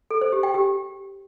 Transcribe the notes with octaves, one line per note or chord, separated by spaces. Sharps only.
A4
C5
G4
G5
G4